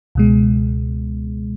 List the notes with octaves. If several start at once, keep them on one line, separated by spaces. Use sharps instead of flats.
C#2 B2 G#3